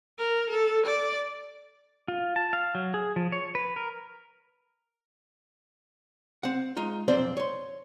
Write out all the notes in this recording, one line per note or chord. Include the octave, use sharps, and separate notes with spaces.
A#4
A4
D5
F4
A5
F5
F#3
G#4
F3
C#5
B4
A#4
C4 F#5
G#3 D#4 F4
B1 F2 C4 D4 C5 D5
C#5 C6